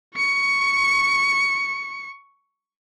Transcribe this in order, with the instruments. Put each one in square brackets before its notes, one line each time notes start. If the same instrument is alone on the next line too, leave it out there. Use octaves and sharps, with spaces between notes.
[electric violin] C#6 C#7